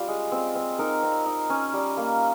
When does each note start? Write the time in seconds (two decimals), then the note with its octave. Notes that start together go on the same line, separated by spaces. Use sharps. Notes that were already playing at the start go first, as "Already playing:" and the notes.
Already playing: G3 C#4 F4
0.08 G#3
0.32 C4
0.55 C4
0.79 D#4 A#4
1.03 C4
1.26 D#4
1.50 C#4
1.73 G3
1.97 A#3